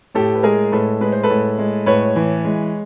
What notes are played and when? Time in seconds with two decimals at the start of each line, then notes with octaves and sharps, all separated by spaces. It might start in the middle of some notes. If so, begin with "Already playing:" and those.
0.15 A2 G4 A4
0.35 B4
0.43 G#3 G#4 A#4
0.72 A2 A4 B4
1.01 G#3 B4
1.12 C5
1.23 A4 B4
1.30 A2
1.58 G#3
1.86 A2 B4 C#5
2.16 E3
2.45 G#3